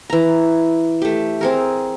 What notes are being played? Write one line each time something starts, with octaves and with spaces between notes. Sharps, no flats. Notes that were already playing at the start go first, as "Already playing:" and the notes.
E3 A#5
A3 G4
C4 G#4 A#4